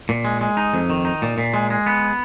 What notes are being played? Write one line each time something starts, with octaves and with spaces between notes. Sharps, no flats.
A#2
G#3
G#3
D#4
F2
D#3
D#4
A#2
A#2
G#3
G#3
B3